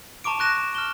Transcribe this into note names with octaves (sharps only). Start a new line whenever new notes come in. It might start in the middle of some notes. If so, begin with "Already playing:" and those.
A5 A#5 C#6 D6 D7
A#5 C#6 F#6 A#6 E7
F6 E7 G7